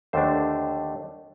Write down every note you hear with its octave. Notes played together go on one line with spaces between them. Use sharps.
D#2 D3 A3 D4 C5